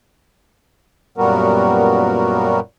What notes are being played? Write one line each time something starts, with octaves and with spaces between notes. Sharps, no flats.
F#2 A#2 G3 B3 F#4 A#4